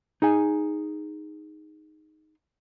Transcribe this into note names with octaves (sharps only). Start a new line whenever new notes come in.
D#4 G#4 G#5